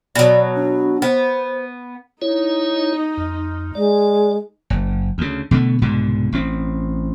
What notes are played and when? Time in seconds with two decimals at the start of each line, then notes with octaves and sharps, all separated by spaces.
0.15 B2 F#3 D5
0.56 D4
1.02 B3 C5
2.22 D#4 E4 C#5
3.17 F2
3.75 G#3 D5
4.70 F#1
5.18 D2 C#3
5.51 B2 D3 A3
5.82 C2 G#2 B2 D3
6.32 A1 C4